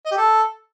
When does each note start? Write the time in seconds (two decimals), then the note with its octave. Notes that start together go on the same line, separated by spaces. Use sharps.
0.06 D#5
0.12 G4
0.18 A4